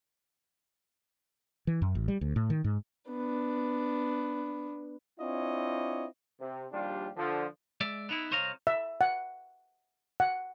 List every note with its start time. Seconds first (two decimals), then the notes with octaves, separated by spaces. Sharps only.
1.67 E3
1.82 F#2
1.95 A1
2.08 G3
2.21 D2
2.36 A2
2.50 D#3
2.64 G#2
3.08 B3 D4
5.20 C4 D4 E4 F4 C#5 D#5
6.40 C3
6.72 A#1 D#2 G3 D4 F4 G4
7.17 D3 F3
7.81 G#3 D5 E5
8.09 B3 D#4 E4
8.31 C2 C5 C#5 D#5 F5 A#5
8.67 E5
9.01 F#5
10.20 F#5